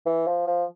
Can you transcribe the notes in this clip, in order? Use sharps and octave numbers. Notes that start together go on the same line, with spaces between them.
E3
F3
F3